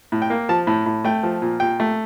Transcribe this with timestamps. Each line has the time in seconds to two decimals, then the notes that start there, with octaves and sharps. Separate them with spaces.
0.12 A2
0.22 G5
0.30 A#3
0.49 F3 A5
0.67 A2
0.86 A2
1.04 A3 G5
1.23 F3
1.42 A#2
1.60 A#2 G5
1.80 A3